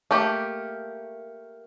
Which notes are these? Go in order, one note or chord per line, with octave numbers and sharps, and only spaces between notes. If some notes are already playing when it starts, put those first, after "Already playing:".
A3 A#3 G4